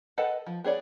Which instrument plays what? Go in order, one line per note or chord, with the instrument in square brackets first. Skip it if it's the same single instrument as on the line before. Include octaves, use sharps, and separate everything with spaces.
[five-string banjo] A4 B4 D#5 F#5 A5
F3
B3 G#4 C#5 D5